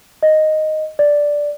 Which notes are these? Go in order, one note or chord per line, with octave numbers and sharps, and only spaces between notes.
D#5
D5